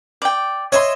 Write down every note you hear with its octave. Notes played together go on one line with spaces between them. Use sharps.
D5 G5
C#5 D#5 E5 C6